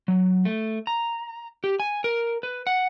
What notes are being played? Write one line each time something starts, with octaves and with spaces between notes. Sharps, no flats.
F#3
A3
A#5
G4
G#5
A#4
B4
F#5